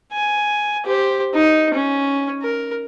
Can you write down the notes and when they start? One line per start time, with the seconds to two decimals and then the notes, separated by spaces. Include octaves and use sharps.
0.12 G#5
0.86 G4 C5
1.34 D#4
1.74 C#4
2.42 A#4